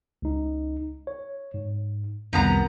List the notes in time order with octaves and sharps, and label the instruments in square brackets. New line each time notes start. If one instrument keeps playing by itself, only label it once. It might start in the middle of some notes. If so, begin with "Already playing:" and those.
[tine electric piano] C#2 D#4
C#5
G#2
[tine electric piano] C2 F2 [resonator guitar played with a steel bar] D#3 B3 A#5